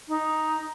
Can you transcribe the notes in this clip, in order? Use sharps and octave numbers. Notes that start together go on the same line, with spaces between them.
D#4